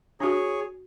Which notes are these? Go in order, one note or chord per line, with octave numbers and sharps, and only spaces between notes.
D4 F#4 G#4 C#5